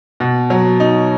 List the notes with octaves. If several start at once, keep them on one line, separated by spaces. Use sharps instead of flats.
B2
F#3
D#4